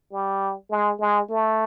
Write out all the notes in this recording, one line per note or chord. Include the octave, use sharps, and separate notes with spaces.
G3
G#3
G#3
A3